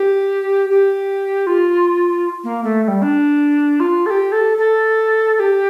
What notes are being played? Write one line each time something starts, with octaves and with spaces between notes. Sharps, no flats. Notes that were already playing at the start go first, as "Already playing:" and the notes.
Already playing: G4
G4
F4
A#3
A3
A3
G3
D4
F4
A4
G4
A4
A4
A4
G4